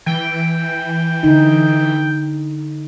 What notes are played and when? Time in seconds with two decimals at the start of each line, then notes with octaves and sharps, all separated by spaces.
0.06 E3 G5
1.23 D3 D#4